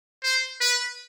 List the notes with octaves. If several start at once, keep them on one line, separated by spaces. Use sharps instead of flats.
C5
B4